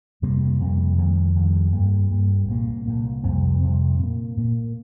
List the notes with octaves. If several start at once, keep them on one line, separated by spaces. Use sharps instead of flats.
F2 C3 G3 A#3
F2 C3 G3 A#3
F2 D#3 G3
F2 D#3 G3
G2 G3 A#3
G2 G3 A#3
C2 A#2 A#3
C2 A#2 A#3
F2 C3 G3 C4
F2 C3 G3 C4
A#2 A#3
A#2 A#3